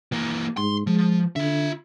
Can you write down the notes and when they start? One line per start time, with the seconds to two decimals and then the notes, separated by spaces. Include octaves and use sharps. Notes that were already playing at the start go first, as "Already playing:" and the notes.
0.12 E3 A#3
0.57 G#2 C6
0.87 F3 G#3
1.36 D3 F4 E5